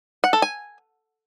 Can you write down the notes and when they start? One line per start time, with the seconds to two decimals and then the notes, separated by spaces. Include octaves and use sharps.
0.24 F#5
0.33 A4
0.42 G#5